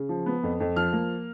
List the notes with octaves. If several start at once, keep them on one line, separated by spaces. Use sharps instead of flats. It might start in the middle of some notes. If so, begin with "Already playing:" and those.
Already playing: C#3
F3
B3
F2
F2
F3 F6
A#3